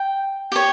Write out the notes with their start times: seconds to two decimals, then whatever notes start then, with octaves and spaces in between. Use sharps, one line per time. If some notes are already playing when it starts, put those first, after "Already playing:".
Already playing: G5
0.52 G4 C#5